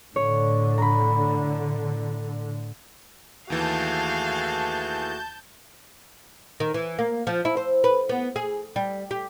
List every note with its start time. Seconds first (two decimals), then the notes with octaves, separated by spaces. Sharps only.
0.16 A2 D3 C#5
0.78 A#5 B5
3.50 D#2 E3 A3 F#4 G#4 F5 A5 G6
6.60 D#3
6.74 E3
6.99 A#3
7.27 F3
7.45 E4
7.57 C5
7.84 B4
8.09 B3
8.36 G#4
8.76 G3
9.11 G4